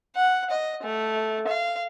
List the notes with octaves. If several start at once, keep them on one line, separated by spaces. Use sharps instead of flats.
F#5
D#5
A3
F5